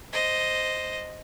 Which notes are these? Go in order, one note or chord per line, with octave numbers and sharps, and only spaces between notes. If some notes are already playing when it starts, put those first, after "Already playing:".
C5 D#5